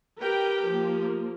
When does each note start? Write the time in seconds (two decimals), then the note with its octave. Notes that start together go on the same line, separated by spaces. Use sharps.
0.21 G4 A#4 B4 G5
0.69 F3 A#3